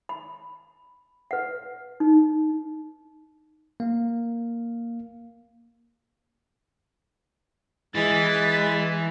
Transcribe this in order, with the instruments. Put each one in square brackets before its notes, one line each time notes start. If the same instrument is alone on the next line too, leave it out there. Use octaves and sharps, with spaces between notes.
[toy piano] B5
B4 F#5
D#4
[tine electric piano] A#3 F5
[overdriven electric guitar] E3 [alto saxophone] G#3 [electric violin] A6 B6